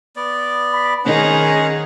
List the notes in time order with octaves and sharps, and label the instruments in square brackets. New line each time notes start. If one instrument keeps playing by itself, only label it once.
[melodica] B3 D5
[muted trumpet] B5
[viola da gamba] D#3 D#4 G#4 [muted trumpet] C#4 [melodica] C5 F#5